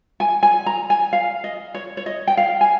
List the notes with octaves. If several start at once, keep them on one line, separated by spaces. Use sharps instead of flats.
G#5
G#5
A#5
G#5
F5
D#5
C#5
C#5
D#5
G5
F5
G#5